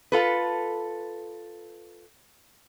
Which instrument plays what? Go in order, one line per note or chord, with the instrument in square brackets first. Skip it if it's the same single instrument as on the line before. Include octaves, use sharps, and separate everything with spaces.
[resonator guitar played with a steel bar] F4 A4 B4